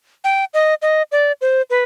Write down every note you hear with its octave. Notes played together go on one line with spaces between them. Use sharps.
G5
D#5
D#5
D5
C5
B4